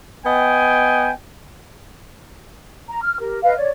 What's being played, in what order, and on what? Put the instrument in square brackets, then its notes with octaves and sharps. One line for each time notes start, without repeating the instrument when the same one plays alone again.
[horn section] B3 D#5 G5 G#5
[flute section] A#5
F6
G4 A#4
B4 D#5 F5
C#5 D5